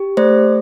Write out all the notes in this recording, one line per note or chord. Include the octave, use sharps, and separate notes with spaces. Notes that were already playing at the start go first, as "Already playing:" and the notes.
Already playing: G4
A3 C5 D5